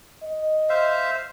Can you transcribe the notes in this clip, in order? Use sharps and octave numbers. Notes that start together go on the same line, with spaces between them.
D#5
C5 E5 F5